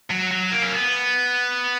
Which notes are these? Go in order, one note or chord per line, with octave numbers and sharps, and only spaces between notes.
F#3
F#3
A#3
C#4
B3